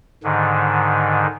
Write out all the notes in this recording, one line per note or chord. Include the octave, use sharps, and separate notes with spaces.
G#2 D3 D#3